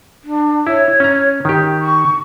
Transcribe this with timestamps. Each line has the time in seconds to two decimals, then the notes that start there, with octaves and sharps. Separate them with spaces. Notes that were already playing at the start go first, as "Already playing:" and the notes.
0.23 D4
0.67 E4 C#5
1.00 C#4 A#5
1.45 D#3 G4 C#6
1.79 C#6